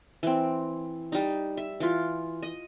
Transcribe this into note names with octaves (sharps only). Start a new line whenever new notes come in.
E3 C4
G3 D#4
E5
E3 F4
D#5